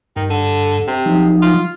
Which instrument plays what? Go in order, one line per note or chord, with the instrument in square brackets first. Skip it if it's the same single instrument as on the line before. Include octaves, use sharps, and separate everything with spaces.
[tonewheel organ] G2 [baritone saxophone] D#3
[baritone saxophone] D3
C3
[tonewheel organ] F3 F#3 D#4
[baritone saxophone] F4